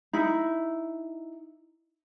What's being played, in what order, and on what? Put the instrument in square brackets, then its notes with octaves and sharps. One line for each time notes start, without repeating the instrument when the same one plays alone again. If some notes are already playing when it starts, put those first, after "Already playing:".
[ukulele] D#4 E4